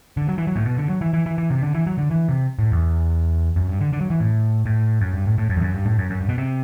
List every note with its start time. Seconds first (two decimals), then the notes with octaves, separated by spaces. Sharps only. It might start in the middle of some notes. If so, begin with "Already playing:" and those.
0.17 D3
0.29 F#3
0.38 E3
0.47 F#3
0.56 A2
0.66 B2
0.77 D3
0.89 F#3
1.01 E3
1.13 E3
1.26 E3
1.38 E3
1.50 C3
1.62 D3
1.74 E3
1.87 F#3
1.98 D3
2.11 E3
2.29 C3
2.59 A2
2.72 E2
3.56 F#2
3.68 G2
3.81 D3
3.93 D3
4.01 F#3
4.10 E3
4.20 A2
4.66 A2
5.01 F#2
5.13 G2
5.26 A2
5.38 A2
5.50 F#2
5.56 E2
5.62 F#2
5.74 G2
5.86 A2
5.99 F#2
6.10 F#2
6.20 G2
6.29 B2
6.38 C3